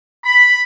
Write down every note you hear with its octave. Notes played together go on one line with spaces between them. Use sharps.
B5